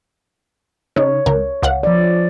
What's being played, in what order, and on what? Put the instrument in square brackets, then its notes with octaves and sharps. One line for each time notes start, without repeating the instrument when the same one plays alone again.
[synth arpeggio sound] C#3 D#4 [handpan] C#5
[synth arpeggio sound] C#2 A#4
C#2 F5 F#5
[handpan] F3 D5